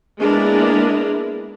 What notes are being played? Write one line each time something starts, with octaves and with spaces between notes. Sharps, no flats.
G#3 A#3 B3 D4 E4 A#4